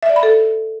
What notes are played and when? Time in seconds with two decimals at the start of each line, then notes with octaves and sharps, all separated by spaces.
0.03 E5
0.09 D5
0.16 B5
0.23 A4